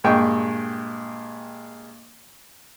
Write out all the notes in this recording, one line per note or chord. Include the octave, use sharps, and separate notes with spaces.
G2 A#2 G#3 G5 C#6